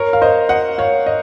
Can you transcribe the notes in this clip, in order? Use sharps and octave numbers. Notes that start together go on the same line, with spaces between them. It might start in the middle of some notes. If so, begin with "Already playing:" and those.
Already playing: A#4 C#5
F5
C5 D#5
D#5 F#5
C#5 F5
D#5